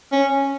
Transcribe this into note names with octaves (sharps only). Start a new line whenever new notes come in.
C#4